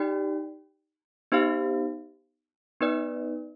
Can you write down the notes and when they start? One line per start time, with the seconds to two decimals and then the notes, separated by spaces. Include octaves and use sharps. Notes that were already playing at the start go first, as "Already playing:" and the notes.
Already playing: D#4 G4 D5 G5
1.32 B3 D#4 G4 C5 F5
2.81 B3 D#4 B4 D5